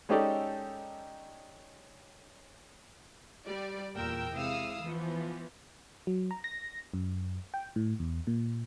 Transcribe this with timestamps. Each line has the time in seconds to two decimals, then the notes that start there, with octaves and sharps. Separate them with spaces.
0.09 G#3 C#4 D#4 G4 A4 D5
3.47 G3 D5
3.95 E2 A#2 F4 A#4 G5 E6
4.33 C3 G#3 E4 F5 D#6 E6
4.82 E3 F3 B3
6.07 F#3
6.31 A#5
6.44 A#6
6.94 F#2
7.54 G5
7.76 A2
8.00 E2
8.27 A#2